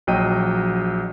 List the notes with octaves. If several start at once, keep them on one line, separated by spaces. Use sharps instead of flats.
A#1 F#3 D#5 G5 D#7